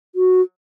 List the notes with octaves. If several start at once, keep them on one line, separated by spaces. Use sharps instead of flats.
F#4